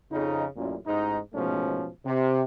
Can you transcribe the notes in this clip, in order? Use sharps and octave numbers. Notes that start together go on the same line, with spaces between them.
F2 C#3 D#4
A1 F#2 A#2
A1 G#2 D#4
A1 G#2 B2 F3 A3 C#4
C3